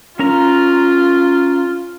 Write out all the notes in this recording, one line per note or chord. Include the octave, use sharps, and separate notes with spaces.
C#4 F4 A#4 A#5